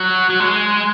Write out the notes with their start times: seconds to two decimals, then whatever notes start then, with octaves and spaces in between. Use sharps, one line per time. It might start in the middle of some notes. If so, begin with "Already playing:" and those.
Already playing: F#3
0.30 F#3
0.40 G#3